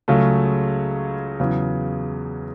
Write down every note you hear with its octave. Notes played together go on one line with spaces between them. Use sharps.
C#2 C#3 F#3 A3 C#4
E2 C#3 F#3